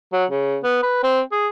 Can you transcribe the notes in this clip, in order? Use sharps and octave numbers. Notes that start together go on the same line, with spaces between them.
F#3
C#3
B3
B4
C4
G#4